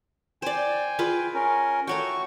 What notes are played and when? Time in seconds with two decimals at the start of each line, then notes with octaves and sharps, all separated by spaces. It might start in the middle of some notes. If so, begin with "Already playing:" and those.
0.42 C5 D5 G5 G#5
0.99 F4 G#4 B4
1.34 C#4 A#4
1.87 A3 F#4 C#5 G5 C#6